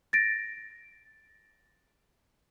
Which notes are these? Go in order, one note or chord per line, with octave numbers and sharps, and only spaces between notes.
A6 A#6 D7